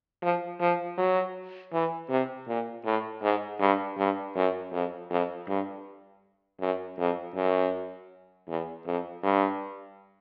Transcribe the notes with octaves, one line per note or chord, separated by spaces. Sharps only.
F3
F3
F#3
E3
C3
A#2
A2
G#2
G2
G2
F#2
F2
F2
G2
F#2
F2
F#2
E2
F2
G2